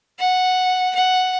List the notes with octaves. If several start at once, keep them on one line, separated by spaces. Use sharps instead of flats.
F#5
F#5